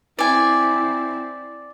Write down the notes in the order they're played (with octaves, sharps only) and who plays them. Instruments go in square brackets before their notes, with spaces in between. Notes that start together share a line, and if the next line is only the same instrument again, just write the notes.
[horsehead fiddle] C4 E4 [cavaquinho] D5 G#5